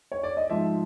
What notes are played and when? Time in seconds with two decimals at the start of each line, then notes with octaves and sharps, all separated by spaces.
0.12 C#5
0.23 D5
0.37 D#5
0.50 G#2 F3 E5